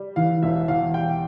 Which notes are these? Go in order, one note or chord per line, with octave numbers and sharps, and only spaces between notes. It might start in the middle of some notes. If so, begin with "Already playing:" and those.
Already playing: G3
E3 F5
E1 E5
E2 F5
G3 G5